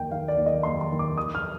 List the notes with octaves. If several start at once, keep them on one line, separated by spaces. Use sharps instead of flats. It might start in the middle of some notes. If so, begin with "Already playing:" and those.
Already playing: D#2 A#3 G5
D#2 F5
D5
D#2
D#5
D#2 C6
C6
D#2
D6
D#3 D#6
F6